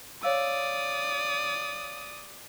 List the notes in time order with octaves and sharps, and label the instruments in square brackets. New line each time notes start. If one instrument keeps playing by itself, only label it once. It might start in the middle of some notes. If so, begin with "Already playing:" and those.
[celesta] C#5 F5 E6 [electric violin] D5 D#6